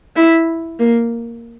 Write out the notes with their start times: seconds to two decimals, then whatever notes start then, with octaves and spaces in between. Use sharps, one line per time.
0.16 E4
0.79 A#3